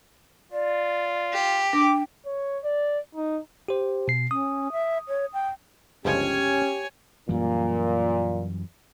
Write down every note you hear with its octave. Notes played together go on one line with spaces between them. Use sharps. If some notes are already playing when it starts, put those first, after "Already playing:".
F4 D5
G4
D4 G5 D6
C#5
D5
D#4
G4 C5
B2 C7
C#4 D#6
E5
C#5
G5
G1 C#2 F3 C#4 G4 C#5 G#5
F#2 A#2 E3 G3